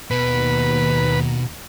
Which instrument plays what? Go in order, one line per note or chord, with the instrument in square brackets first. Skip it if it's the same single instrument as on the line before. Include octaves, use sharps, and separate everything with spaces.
[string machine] D#2 A#5 [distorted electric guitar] B2 [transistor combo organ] B4